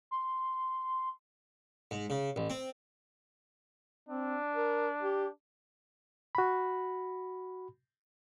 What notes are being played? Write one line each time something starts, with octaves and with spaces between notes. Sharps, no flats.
C6
G#2
C#3
A1
C4
C4 D4
A#4
G4
F#4 B5